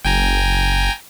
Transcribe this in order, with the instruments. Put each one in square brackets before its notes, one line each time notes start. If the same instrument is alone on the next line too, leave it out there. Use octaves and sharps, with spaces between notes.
[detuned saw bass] F#1 [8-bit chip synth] G5 G#5 A#5